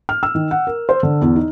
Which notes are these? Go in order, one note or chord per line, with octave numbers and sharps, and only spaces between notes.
F6
E6
D#3
F#5
A#4
C5
D3
E2
D#4